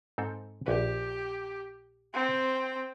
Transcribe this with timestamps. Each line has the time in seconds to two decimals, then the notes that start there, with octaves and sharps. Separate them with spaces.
0.18 G#2 C4 A4
0.66 A#1 G4 B4
2.14 C4 G5